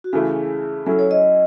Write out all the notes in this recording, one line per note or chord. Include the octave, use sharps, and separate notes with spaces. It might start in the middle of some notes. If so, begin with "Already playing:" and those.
F#4
C#3 E3 A3 E4 G#4
F#3 C#4 E4 A4
C#5
D#5